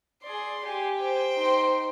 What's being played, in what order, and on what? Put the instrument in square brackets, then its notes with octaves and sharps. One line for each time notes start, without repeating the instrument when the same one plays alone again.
[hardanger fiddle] G#4 D5 [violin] C6
[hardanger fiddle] G4 G#5
[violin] C5 G5
[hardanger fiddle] D#4 C6